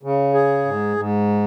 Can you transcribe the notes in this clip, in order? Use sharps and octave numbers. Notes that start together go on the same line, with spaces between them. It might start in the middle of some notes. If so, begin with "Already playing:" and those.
C#3
G#4
G#2
G#2